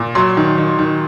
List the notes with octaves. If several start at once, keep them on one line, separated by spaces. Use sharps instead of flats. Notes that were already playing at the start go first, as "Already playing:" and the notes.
Already playing: A#2
F#3 C6
D#3
D#3
D#3